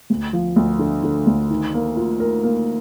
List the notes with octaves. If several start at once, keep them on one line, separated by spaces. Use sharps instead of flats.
D2
F3
D2
D3
D3
D2
D#3
A#3
F4
A#4
A#3